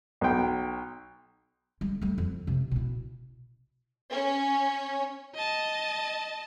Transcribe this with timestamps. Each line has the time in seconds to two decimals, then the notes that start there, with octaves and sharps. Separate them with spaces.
0.21 B1 G5
1.81 G3
2.01 G3 A3
2.18 F2
2.47 C3
2.71 B2 E4
4.12 C#4
5.35 D#5 A5